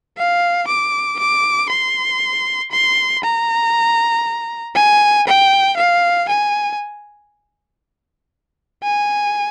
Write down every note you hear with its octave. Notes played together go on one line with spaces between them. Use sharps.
F5
D6
D6
C6
C6
A#5
G#5
G5
F5
G#5
G#5